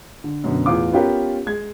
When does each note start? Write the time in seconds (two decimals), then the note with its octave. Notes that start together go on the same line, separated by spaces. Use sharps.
0.24 D3
0.44 F#2 B2 D3
0.66 E2 A2 F4 D6
0.93 B3 C#4 F4 G4 A#4 B4
1.46 G#3 G#6